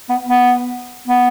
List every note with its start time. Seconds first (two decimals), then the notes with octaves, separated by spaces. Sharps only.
0.09 B3
0.29 B3
1.08 B3